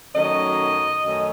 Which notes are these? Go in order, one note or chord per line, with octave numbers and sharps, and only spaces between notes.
F#2 D#3 F#3 A3 C#4 D#5
F#2 D#3 F#3 A3 C#4